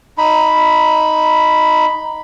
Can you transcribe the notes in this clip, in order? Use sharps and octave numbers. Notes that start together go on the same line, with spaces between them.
D#4 B5